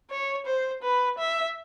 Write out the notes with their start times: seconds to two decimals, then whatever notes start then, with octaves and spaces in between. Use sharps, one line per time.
0.10 C#5
0.46 C5
0.83 B4
1.19 E5